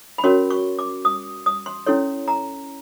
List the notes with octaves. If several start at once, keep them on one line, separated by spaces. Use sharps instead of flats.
B5
C#4 F#4 A#4 C#5 C6
C#6
D6
D#6
D#6
C6
C#4 E4 A4 C#5 C6
A#5